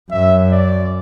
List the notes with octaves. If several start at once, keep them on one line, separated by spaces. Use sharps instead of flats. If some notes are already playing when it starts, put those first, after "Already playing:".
F#2 E5
D5